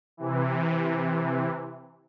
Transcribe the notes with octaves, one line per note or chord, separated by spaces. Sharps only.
C3 E3